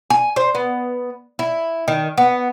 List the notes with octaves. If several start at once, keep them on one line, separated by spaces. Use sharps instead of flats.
G#5
C5
B3
E4
D#3
B3